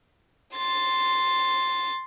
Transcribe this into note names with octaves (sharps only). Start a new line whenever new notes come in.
C6 A6